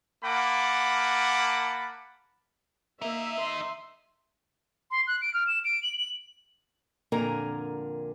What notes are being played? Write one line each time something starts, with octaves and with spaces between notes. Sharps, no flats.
A#3 F#5 A5 B5 D6
A#3 D#4 A#4 E5
C6
C6
F#6
D7
F6
E7
D7
F#7
F#7
F2 A#2 D3 A#4 G#5 A#5